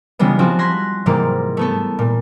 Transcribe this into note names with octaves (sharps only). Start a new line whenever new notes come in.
C#3 E3 G3 G#3 B3
F3 G3 B3 C4 F4 F#4
C6 F#6 G#6 A#6 B6
G#2 C3 E3 G3 A#3
A3 B3 A4
A#2